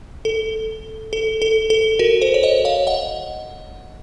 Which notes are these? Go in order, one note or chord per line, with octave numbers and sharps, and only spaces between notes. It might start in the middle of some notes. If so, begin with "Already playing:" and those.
A4
A4
A4
A4
F#4 A#4
A4 C5
C#5
C5 D#5
C#5 F5
D#5 F#5